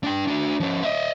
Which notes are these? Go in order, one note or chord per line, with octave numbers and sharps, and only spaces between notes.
D4 G5
D4 F#4
F3 C#4
D#5 E5